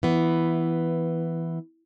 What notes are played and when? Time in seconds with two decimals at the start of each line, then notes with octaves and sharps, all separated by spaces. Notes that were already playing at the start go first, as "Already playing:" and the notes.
0.03 E3 B3